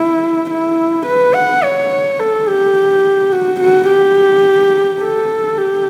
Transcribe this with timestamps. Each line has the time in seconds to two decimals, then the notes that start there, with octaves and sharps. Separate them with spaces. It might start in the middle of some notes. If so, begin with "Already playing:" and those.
Already playing: E4
0.50 E4
1.06 B4
1.34 F#5
1.63 C#5
2.20 A4
2.48 G4
3.32 F#4
3.61 F#4
3.88 G4
5.01 A4
5.58 G4